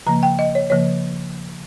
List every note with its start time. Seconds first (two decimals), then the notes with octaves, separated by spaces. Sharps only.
0.06 C#3 F3 A#3 A#5
0.23 G5
0.39 D#5
0.55 C#5
0.70 C#3 F3 A#3 C#5